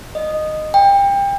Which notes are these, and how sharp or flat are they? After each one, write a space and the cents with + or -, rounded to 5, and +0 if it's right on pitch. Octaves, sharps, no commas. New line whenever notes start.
D#5 -10
G5 +30